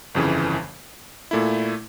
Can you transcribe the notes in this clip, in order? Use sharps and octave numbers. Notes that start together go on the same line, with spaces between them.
G1 F2 C#3 E3
A#2 A3 E4